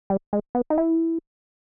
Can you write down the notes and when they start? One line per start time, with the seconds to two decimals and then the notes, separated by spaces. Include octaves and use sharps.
0.10 G3
0.33 G#3
0.55 B3
0.70 D#4
0.78 E4